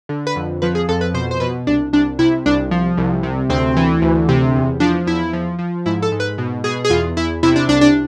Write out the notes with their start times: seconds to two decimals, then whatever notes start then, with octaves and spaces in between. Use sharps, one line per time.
0.09 D3
0.27 B4
0.36 F2
0.62 F3 B4
0.75 G#4
0.89 F2 A4
1.01 B4
1.14 B2 C5
1.31 C5
1.40 B2 B4
1.67 C2 D4
1.93 C2 D4
2.19 C3 E4
2.46 C2 D4
2.71 F3
2.97 C2
3.23 C3
3.49 D2 C4
3.77 E3
4.02 D2
4.29 C3
4.55 E2
4.80 F3 D4
5.07 E2 E4
5.33 F3
5.59 F3
5.86 G#2 E4
6.02 A4
6.12 G#2
6.20 B4
6.38 B2
6.64 B2 G#4
6.85 G#4
6.90 E2 F4
7.17 E2 E4
7.43 C3 E4
7.56 D4
7.68 C2 D4
7.81 D4